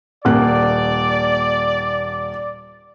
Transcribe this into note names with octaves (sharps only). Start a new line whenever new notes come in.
D#1 A#3 D5 F#6